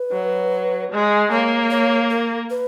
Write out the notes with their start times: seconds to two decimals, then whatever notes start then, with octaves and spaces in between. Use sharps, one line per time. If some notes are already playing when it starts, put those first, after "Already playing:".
Already playing: B4
0.12 F#3
0.91 G#3
1.31 A#3 C#5
1.71 C#5
2.10 A#4
2.50 B4